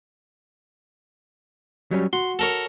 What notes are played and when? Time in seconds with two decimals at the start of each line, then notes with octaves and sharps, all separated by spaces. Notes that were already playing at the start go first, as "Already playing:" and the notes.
1.91 F#3 G3 C#4
2.13 F#4 C6
2.39 A4 A#4 C#5